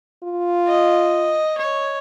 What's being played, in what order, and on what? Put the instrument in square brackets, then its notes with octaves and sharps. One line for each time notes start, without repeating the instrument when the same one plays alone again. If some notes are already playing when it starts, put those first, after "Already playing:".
[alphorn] F4
[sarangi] D#5
C#5